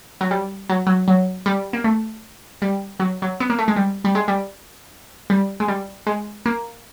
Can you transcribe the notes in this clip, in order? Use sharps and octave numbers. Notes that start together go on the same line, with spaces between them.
F#3
G3
F#3
F#3
F#3
G3
A#3
A3
G3
F#3
F#3
B3
A#3
A3
G#3
G3
G3
G#3
G3
G3
G#3
G3
G#3
A#3